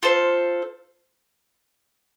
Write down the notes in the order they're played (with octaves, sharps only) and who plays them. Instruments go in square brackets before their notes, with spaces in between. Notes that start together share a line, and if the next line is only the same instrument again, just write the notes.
[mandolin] F4 A4 C5